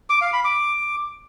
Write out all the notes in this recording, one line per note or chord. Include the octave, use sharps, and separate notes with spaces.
D6
F5
B5
D6